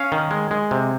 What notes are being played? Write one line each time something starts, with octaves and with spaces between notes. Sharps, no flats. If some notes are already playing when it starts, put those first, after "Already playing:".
Already playing: C#4 F5
D#3
G#3
G#3
C3